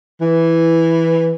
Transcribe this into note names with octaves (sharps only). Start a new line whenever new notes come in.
E3